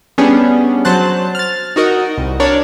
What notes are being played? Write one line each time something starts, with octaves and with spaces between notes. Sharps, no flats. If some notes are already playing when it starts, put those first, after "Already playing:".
G3 B3 C#4 D4 G#4
F#3 C5 A5 F#6
F6 A6
D#4 F#4 A#4 D#5
C2
D4 A#4 C#5 D5